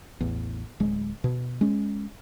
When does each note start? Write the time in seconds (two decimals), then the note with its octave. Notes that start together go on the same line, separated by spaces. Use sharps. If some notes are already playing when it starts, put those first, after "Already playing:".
0.21 A1 E2
0.80 D1 G#3
1.24 B2
1.61 G#3 C#4